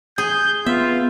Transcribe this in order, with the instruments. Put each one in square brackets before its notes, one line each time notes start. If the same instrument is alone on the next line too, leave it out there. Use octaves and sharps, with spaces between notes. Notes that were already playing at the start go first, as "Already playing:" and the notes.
[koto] G#4 [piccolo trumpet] G6
[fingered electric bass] B3 [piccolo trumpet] F4 [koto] E5